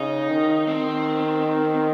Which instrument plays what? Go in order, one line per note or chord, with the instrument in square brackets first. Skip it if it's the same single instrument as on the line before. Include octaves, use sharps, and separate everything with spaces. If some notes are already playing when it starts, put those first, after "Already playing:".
Already playing: [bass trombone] C#3 [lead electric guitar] D#4
[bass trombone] D#3
[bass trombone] D#3 [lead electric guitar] C4